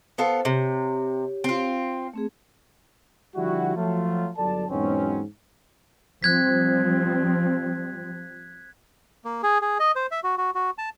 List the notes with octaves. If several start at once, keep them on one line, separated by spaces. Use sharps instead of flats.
B3 F4 A4 C5
C3 G4 C#5
C4 F4
A3 C4 G#4
D3 F3 G3 E4 F#4
F3 F#3 A3 F4
G1 F#3 A4 D5 A5
E2 G#2 B2 F#3 C4 C#4
F3 G3 C4 F#6 G#6 B6
A#3
G#4
G#4
D#5
C5
E5
F#4
F#4
F#4
A5